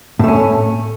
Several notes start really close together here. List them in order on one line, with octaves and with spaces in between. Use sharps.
A2 A3 C#4